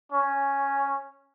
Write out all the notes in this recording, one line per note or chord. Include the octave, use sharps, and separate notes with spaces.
C#4